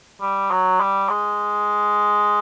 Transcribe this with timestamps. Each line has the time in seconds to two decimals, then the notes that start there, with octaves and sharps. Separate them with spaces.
0.21 G3
0.51 F#3
0.80 G3
1.09 G#3